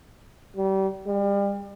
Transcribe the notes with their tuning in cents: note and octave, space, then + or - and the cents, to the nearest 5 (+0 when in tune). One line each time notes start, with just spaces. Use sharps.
G3 -30
G3 +35